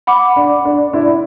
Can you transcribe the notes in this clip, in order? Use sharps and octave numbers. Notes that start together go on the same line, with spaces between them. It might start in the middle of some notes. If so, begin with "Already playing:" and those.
F#5 B5 D6
D4
D4
D4 E4